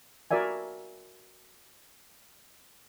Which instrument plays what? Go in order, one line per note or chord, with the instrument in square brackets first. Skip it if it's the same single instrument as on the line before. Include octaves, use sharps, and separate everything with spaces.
[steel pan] F#4 A#4 D5 E5 G#5